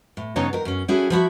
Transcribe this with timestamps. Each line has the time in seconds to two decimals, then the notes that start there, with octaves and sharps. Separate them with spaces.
0.17 A2
0.36 G2 C#3 B3 D#4 C#5 A#5
0.53 D#3 A#4
0.65 F#2 C#4
0.88 G3 C#4 E4 F#4 G#4 A4
1.10 F3 E4 F#4 E5